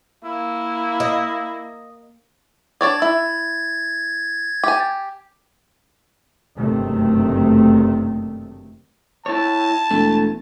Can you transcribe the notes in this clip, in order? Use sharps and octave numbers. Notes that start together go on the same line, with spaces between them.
A#3 E4
D#5
D4 C#5 D5 G#6 A6
E4
G4 G#5
F#1 G2 C3 D#3 A3
E4 C#5 A5
E1 A3